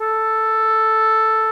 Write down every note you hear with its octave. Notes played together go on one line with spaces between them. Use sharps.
A4